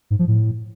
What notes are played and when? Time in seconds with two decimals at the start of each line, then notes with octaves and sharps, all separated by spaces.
0.10 G#2
0.19 F3
0.28 A2